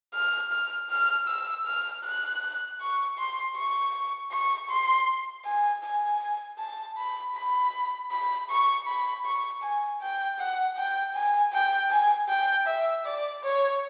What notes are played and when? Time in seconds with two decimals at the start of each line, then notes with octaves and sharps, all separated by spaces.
0.14 F6
0.52 F6
0.90 F6
1.28 E6
1.66 F6
2.04 F#6
2.80 C#6
3.18 C6
3.56 C#6
4.32 C#6
4.70 C6
5.45 G#5
5.84 G#5
6.59 A5
6.97 B5
7.35 B5
8.11 B5
8.50 C#6
8.87 B5
9.25 C#6
9.63 G#5
10.01 G5
10.39 F#5
10.77 G5
11.15 G#5
11.53 G5
11.90 G#5
12.29 G5
12.67 E5
13.05 D5
13.43 C#5